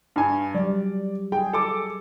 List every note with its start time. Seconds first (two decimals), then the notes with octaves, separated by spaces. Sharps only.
0.16 G2 G#5
0.55 F#3 G3 D5
1.32 G#4 G5
1.53 A4 D6